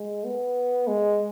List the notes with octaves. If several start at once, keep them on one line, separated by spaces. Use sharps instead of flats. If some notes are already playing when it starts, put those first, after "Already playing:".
Already playing: G#3
B3
G#3